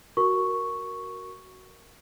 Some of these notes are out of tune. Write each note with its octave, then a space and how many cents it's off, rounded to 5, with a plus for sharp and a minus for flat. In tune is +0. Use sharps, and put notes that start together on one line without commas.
F#4 +5 A#4 +0 C#6 +0